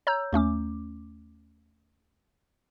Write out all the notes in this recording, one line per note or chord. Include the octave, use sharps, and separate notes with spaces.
C#5 A#5 E6 G6
D#2 A3 C#4 D6